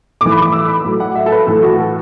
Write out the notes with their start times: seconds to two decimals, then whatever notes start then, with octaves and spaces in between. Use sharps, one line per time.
0.21 A2 E3 D6
0.31 B5
0.42 D6
0.53 E6
0.68 B5
0.84 A2 F#3
1.00 F#5
1.15 E5
1.26 A4
1.32 B4
1.47 A2 E3 A4
1.63 F#4
1.79 A4